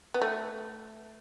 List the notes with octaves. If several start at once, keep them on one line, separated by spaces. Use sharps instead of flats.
B3
A3